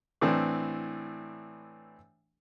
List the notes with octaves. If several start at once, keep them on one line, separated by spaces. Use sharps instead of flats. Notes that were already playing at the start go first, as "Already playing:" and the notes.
A2 E3 C4 D4